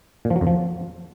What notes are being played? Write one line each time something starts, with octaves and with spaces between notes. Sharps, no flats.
A#2
F3
F#3
F2
F3